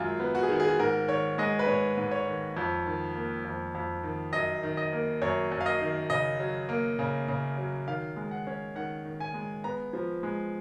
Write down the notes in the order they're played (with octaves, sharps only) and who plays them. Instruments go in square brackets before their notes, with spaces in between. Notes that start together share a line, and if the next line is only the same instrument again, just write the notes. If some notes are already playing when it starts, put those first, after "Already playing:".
Already playing: [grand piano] F#2 D#3 G#3 F4
B3
F#4
G#4
D#3 F#4
G#4
F#4
G#2 A#4
D#3 C#5
G#3 D#5
B4
G#2 C#5
G#2
C#5
D#3
F2
D#3
A#3
F2
F2
D#3
F#2 D#5
D#3
D#5
A#3
F#2 C#5
F#2
F5
D#5
D#3
C#3 D#5
F#3
A#3
C#3
C#3
F#3
D#3 F5
G#3
F#5
C#4
D#3 F#5
D#3
G#5
G#3
B3 A#5
F3
G#3